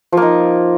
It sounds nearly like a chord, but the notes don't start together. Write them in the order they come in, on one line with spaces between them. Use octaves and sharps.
F3 A#3 D#4